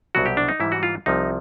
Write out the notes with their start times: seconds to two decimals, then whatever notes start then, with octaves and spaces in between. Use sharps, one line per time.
0.15 C2 B2 F#3 F#4
0.26 G4
0.37 D4
0.48 D#4
0.60 G#2 E3 G3 E4
0.72 F#4
0.83 F4
1.06 C2 C3 F3 D#4